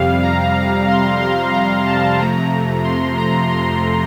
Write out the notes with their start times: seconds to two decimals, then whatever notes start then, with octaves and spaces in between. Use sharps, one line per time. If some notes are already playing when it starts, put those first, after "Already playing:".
Already playing: F2 C3 G3 F5
0.22 A#5
0.88 C6
1.20 C6
1.53 A#5
1.86 A5
2.19 F2 C3 F3 A3 A#5
2.84 C6
3.17 A#5
3.50 C6